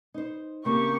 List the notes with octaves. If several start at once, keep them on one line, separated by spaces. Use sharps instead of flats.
D#4 C5
C#3 A#3 C4 G4 C#6